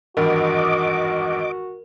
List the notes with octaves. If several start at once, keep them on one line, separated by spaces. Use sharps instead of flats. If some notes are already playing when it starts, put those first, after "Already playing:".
G#1 E2 G2 F#4 A#4 D#5 D6